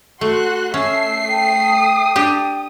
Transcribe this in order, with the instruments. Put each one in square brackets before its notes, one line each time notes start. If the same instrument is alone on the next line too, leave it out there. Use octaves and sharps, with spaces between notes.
[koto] A3 [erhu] F#4 [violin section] C6 F#6
[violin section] A3 C7 [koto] C#4 [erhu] E5
[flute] G5 [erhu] D#6
[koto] D4 G4